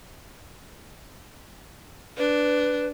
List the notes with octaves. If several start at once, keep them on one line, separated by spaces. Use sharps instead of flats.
D4 B4